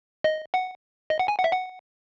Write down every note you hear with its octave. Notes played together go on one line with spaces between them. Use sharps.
D#5
F#5
D#5
F#5
G#5
F#5
E5
F#5